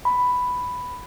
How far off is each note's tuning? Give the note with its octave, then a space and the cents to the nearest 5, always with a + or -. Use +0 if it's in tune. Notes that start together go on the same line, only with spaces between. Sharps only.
B5 +5